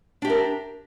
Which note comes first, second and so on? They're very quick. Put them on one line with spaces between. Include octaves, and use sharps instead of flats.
D4 G4 E5 A#4